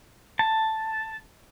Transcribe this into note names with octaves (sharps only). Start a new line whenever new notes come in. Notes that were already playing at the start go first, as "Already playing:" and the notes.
A5